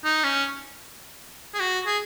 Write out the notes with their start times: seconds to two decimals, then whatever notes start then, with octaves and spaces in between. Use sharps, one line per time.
0.04 D#4
0.24 C#4
1.54 G#4
1.60 F#4
1.86 G#4